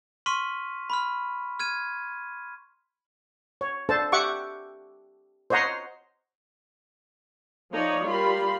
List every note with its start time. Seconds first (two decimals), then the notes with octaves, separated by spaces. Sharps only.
0.26 C6 C#6 F6 B6 D#7
0.90 B5 C6 F6
1.59 F6 G#6 D#7
3.61 C#5
3.89 D4 A4 C5 A5
4.12 G4 E5 F#5 C#6 D6
5.50 C5 C#5 D#5 F#5 A#5 C6
7.72 F3 D#4 C#5 D5
8.05 G3 F4 A#4 B5 C6